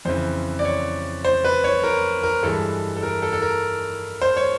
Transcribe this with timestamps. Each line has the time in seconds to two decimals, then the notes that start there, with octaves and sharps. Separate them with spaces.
0.05 F2 C#3 E3 C5
0.59 D5
0.65 C#5
1.25 C5
1.45 B4
1.64 C#5
1.83 A#4
2.23 A#4
2.43 G2 E3 G#3 A4
2.96 A4
3.03 A#4
3.22 A4
3.33 A4
3.42 A#4
4.22 C5
4.37 C#5